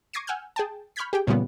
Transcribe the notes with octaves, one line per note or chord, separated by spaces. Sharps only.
C#6 D6 G#6 A#6 C7 D#7
F#5 G#5 E6 F6 G6
G#4 G5 A5
B5 C#6 F6 G6 G#6 B6
G4 G#4 G5
F#2 A#2 C#3 E3 G3 B3